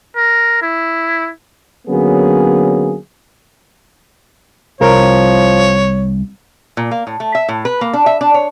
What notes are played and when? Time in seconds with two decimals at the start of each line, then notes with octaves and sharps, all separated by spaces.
0.17 A#4
0.62 E4
1.88 D3 F#3 A#3 B3 C#4 G#4
4.81 C2 F3 A#4 C#5
6.77 A#2
6.91 A#3
7.07 A2
7.20 A3
7.35 E5
7.49 A2
7.65 B4
7.81 A#3
7.93 D4
8.06 E5
8.21 D4
8.34 C#5